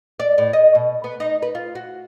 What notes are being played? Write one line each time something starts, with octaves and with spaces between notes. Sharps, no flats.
D5
A2
D#5
B2
B3
D#4
B4
F4
F#4